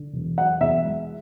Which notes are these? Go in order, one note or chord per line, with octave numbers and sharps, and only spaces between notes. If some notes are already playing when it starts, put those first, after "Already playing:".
Already playing: D3
E1
F#3 F#5
E2 E5
G#3